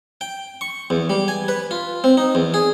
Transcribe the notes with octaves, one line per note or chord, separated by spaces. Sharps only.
G5
C#6
E2
G3
G#5
B4
F4
C4
D#4
E2
G#4